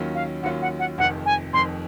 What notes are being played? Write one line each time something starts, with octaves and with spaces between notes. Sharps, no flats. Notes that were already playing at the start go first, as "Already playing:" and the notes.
Already playing: D#2 D#3 F#3 C#4 F4
F5
D#2 D#3 F#3 C#4 F4 F#5
F#5
F#5
F1 F2 D#3 F#5
G#5
F1 F2 D#3 C6